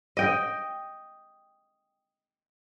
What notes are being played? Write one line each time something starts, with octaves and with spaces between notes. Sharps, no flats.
D#5 G5